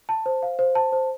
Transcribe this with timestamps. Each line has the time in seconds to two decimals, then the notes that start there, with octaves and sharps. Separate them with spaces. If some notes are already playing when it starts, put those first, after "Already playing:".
0.09 A5
0.26 C5
0.43 F5
0.59 C5
0.75 A5
0.93 C5